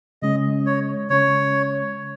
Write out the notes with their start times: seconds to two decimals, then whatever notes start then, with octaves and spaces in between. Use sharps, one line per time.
0.22 C#3 G#3 C#4 D#5
0.66 C#5
1.10 C#3 G#3 C#4 C#5